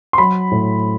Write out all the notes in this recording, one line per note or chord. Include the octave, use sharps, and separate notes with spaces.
C6
F#3 B5
A2